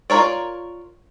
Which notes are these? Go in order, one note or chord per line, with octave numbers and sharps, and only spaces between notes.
F4 G#4 A#4 C#5 D5